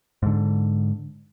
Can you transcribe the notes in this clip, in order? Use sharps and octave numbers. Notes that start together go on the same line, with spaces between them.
G#2 D3